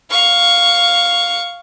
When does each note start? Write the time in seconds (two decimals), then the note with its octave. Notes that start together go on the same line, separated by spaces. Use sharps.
0.11 F5 C#6